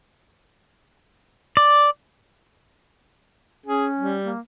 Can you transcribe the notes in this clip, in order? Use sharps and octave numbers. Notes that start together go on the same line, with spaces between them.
D5
C#4 G#4
G3
A#3